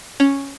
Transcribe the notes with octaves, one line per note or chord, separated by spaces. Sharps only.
C#4